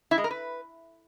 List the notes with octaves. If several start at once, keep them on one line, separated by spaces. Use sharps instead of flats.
E4
G#3
A#4
B4